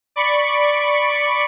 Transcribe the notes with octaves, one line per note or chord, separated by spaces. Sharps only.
D5 B5 C#6 C#7 D7